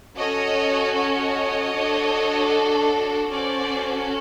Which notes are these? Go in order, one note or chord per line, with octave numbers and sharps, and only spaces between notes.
C#4 F#4 A4 C#5 D#5
C#5 D#5
D4 F#4 A4
C#4 F#4 A4 C5 D5